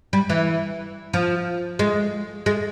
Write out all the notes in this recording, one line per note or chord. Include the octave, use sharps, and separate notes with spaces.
G3
E3
F3
G#3
G#3